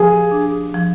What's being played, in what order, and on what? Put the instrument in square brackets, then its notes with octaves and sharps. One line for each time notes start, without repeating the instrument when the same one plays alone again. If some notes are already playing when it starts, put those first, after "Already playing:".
Already playing: [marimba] F3 G4 [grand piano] G#4
[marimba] D4
F3